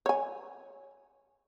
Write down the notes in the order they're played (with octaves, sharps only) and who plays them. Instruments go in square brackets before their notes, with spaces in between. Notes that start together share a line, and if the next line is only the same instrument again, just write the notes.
[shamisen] C#5 G#5